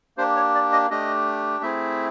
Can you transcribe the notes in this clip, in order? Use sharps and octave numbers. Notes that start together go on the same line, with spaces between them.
A#3 D4 G4 C5
C#5
D5
D#5
A3 D4 G4 D#5
A3 C4 E4 G#4 E5